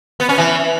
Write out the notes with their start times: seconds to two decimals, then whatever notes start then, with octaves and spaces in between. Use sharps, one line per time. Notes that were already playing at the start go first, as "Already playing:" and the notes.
0.20 B3
0.29 C#4
0.38 E3